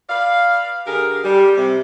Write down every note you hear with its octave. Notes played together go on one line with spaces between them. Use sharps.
B4 D5 F5
D3 G4 G#4 A#4
G3
C3